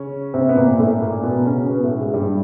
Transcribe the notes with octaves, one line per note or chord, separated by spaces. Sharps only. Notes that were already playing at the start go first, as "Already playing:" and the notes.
Already playing: C#3 C#4
C3 C4
B3
A#2 A#3
A2 A3
A#2 A#3
B2 B3
C#3 C#4
B2 B3
A2 A3
G#2 G#3
G2 G3